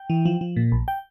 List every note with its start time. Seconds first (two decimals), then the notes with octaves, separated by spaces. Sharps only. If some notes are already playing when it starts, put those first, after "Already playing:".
Already playing: G5
0.10 E3
0.25 F3
0.41 F3
0.56 A#2
0.72 A#1
0.88 G5